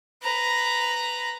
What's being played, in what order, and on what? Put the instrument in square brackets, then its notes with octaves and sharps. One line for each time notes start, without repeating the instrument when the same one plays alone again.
[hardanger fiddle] B4 A#5